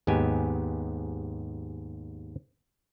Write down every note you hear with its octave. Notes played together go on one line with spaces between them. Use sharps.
D#2 G#2 G#3 B3 G4 G#5